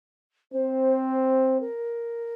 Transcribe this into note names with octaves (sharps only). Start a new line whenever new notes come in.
C4 C5
A#4